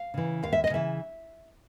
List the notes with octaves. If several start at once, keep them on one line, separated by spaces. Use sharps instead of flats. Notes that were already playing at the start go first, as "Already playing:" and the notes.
Already playing: F5
C#3 E3
D#2 F5
E5
D#5
C#3 E3 E5